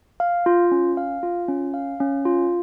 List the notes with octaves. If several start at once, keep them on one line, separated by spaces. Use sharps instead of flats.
F5
F4
C#4
F5
F4
C#4
F5
C#4
F4